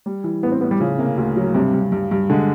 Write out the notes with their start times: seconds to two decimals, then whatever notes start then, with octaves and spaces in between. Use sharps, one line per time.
0.06 G3
0.24 E3
0.43 A2 B3
0.52 C4
0.61 A2 B3
0.71 G3
0.80 C#3 F3
0.98 C3 A#3
1.17 D2
1.36 F#3
1.55 G2 C3
1.73 G2
1.92 G2
2.11 G2
2.30 D3 G#3